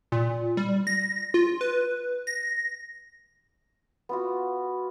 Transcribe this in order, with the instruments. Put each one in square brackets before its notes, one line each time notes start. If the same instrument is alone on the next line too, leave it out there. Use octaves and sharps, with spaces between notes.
[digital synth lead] A#2
G3
A#6
F4
B4
A#6
[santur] B3 F4 F#4